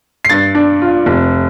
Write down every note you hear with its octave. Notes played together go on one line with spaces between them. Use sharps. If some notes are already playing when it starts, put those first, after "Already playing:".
C7
G2 A6
D4
F4
F1